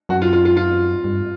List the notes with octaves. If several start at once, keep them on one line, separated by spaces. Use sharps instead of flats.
F#2 F#4
F4
F4
F4
F4
G2